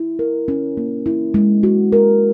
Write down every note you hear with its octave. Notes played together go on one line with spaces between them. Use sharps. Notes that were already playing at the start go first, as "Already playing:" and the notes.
Already playing: E4
A#4
C#4
A#3
E4
G#3
F#4
A#4